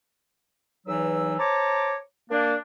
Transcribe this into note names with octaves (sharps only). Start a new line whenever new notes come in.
E2 E3 F#3 D#4 E6
C5 C#5 A5 A#5 D6
A#3 D4